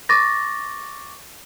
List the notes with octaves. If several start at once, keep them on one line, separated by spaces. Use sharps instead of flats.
C#6 D6 A6 A#6